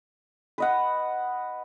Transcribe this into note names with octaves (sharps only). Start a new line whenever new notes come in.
B4 D#5 F#5